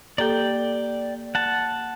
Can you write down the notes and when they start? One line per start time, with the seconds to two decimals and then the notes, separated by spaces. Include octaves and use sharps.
0.18 A#3 G4 A4 D5 G5
1.35 F#5 A5